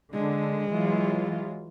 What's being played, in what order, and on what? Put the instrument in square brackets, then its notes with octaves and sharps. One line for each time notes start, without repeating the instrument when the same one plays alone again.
[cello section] D3 [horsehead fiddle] G#3
[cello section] E3 F#3 F4